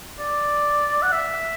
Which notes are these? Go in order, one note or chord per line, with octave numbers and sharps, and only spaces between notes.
D5
F#5
E5